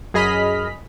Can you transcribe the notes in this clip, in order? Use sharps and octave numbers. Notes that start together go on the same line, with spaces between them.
F#2 G#4 D#5 B5 F6 B6